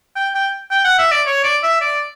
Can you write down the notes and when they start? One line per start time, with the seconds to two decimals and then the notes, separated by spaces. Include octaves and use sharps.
0.16 G5
0.35 G5
0.71 G5
0.85 F#5
0.99 E5
1.12 D5
1.27 C#5
1.44 D5
1.63 E5
1.81 D5